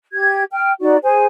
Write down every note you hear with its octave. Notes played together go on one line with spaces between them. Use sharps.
G4 G#6
G5 F6
D#4 F#4 D5
G#4 C5 G#5